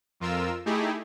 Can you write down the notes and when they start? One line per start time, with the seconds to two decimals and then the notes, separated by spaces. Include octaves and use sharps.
0.20 F2 F4 A#4 E6
0.66 A3 D#4 E4 G4 G#4